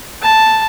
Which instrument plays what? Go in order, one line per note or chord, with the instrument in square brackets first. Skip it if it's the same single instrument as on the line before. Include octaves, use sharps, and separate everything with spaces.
[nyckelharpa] A5